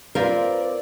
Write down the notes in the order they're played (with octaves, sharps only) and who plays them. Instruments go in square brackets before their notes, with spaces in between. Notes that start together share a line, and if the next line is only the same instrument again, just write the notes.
[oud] C4 F4 B4 [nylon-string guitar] A#4 [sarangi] D5